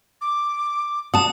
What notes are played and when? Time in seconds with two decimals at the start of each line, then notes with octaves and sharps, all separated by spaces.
0.21 D6
1.14 F#5 A5 D#6